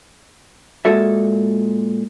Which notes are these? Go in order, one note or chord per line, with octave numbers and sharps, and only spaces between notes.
A#2 G#3 A#3 F#4 A4 E5